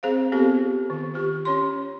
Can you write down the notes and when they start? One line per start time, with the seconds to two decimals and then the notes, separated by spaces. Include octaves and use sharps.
0.03 C4 G#4 C5 F5
0.32 B3 C4 F4 G4 A4
0.90 D#3
1.14 F4 G4
1.45 C#4 C#5 C6